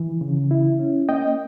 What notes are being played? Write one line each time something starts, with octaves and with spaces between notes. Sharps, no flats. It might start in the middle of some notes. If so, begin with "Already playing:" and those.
Already playing: E3
C#3
E4
C#4
A#3 D#5 G5